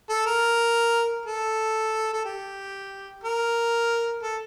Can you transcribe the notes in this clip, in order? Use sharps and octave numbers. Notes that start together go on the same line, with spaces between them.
A4
A#4
A4
A4
G4
A#4
A4